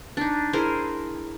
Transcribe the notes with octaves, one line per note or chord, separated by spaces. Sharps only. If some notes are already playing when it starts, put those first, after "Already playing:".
D4 D#4
E4 G#4 A#4 C5